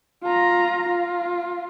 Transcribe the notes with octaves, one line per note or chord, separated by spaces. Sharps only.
F4 A#5
F4